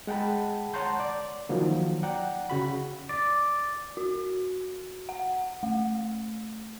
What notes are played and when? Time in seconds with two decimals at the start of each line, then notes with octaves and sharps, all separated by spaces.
0.07 G#3 F#5 G5 A5 B5
0.74 C#5 F#5 A5 A#5 C6 G6
1.00 D5
1.49 D#3 F3 F#3 A#3
2.03 D5 F#5 G5 A#5
2.50 C#3 F#4 B5
3.09 D5
3.97 F#4
5.09 F#5
5.63 A3